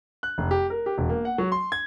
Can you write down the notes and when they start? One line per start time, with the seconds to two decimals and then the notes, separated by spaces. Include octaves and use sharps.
0.23 F#6
0.38 F1
0.51 G4
0.70 A#4
0.86 G4
0.98 E1
1.09 A#3
1.25 F#5
1.38 F#3
1.52 C6
1.72 G#6